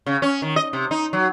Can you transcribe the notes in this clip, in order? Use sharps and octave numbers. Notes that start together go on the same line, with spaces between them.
C#3
C#4
D#3
D#5
C3
D#4
F#3